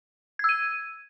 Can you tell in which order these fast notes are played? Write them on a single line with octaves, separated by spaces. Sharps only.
G#6 E6 D#7